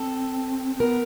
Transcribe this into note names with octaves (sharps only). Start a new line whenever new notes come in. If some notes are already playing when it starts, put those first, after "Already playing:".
Already playing: C4 A4
C4
B3 A#4